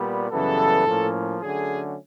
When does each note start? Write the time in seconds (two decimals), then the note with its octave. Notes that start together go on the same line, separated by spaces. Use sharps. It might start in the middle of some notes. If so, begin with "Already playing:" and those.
Already playing: A#2 G3 B3
0.31 F#2 C#3 E3 G3 B3 A4
0.86 A2 F3 A#3 C#4
1.41 D3 F#3 A3 C#4 G#4